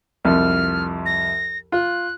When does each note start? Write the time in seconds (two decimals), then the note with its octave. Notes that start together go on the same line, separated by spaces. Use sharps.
0.25 C2 F2 F6
1.06 A#6
1.72 F4 F#6